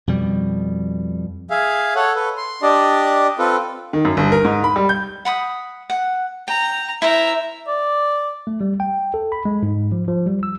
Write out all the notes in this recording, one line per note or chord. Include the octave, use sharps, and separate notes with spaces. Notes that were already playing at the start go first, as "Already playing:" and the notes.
F2 B2 G3
G#4 E5 F5
A4 C#5 F#5
A4 B4
C6
D4 G4 D5 D#5
C4 F4 A4 B4
D#3
F#2
G1
A#4
G#2
B5
G3
G6
F#5 B5 D#6
F#5
G5 A#5
E4 A#4 C5 E5 A#5
D5
A3
G3
G5
A4
B5
G#3
G#2
F3
F3
G3
E6